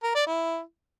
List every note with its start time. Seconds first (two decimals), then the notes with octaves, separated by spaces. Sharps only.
0.03 A#4
0.15 D5
0.26 E4